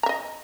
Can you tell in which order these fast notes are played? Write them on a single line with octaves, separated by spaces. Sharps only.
A#5 E5 D#5